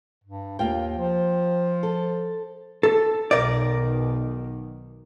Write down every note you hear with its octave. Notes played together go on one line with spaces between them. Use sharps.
G2
D#2 A#3 F4 G5
F3
A4
A4
B1 B2 D#3 A#4 D5